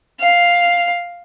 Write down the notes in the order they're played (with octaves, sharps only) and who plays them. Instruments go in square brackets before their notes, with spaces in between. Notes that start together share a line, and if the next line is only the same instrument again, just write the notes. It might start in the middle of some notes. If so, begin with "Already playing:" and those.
[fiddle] F5